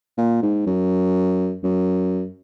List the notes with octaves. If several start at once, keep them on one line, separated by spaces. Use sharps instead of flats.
A#2
G#2
F#2
F#2